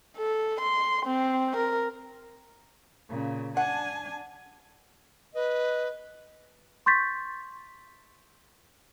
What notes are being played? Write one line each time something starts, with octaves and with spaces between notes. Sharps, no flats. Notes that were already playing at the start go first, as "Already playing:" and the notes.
A4
C6
C4
A#4
A#2 C#3
D4 F#5 G#5 A5
B4 D#5
C6 C#6 G6 A6 B6